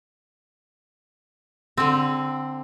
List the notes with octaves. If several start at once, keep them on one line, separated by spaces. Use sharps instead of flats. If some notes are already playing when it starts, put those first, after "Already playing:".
D3 C4